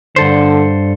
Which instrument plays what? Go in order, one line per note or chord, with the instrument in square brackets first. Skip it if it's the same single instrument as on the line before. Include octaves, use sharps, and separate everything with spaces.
[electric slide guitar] G2 A4 C5 [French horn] D3